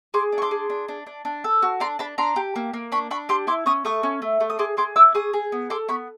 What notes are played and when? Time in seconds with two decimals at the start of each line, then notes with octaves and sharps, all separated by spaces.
0.14 G#4 C6 D6
0.32 D4
0.38 C#6
0.42 C6 D6
0.51 G#4
0.70 D4
0.88 D4
1.06 D4
1.25 D4
1.44 A4
1.62 F#4
1.80 D4 A#5 C6
1.99 D4 A5 B5
2.18 D4 A#5 C6
2.36 G4
2.56 A#3
2.74 A#3
2.92 D4 B5 C#6
3.11 D4 B5 C#6
3.29 G4 C6 D6
3.47 E4 C6 D6
3.66 C#4 C#6 D#6
3.85 A3 C#6 D#6
4.03 C#4
4.22 A3
4.40 A3
4.50 D#6
4.59 G#4 C6 D6
4.77 G#4 C6 D6
4.96 E4 D6 E6
5.15 G#4 C#6 D#6
5.33 G#4
5.52 B3
5.70 A4 C6 D6
5.88 B3 B5 C#6